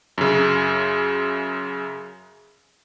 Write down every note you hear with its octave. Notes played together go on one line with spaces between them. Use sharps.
F#2 C#3